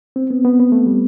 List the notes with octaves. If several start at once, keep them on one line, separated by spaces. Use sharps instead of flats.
C4
B3
B3
B3
A3
G3